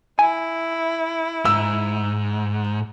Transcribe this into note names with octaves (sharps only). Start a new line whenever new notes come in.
E4 G#5
G#2 E6